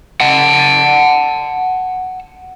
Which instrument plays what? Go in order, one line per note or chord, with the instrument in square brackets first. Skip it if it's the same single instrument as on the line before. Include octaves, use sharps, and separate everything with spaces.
[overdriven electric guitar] F#5 A5